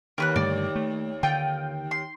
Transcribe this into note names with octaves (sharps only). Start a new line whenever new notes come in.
D#2 A#4 B4 F#6
G2 D3 A3 D5
A3
D3 F4 G5
C6